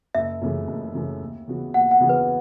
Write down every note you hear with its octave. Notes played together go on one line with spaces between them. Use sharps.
F#1 E5
F#2 C#3 E3 A3
F#1
F#2 C#3 E3 A3
D#2
C#3 E3 B3 F#4
D#2 F#5
F#5
C#3 E3 B3 F#4
B4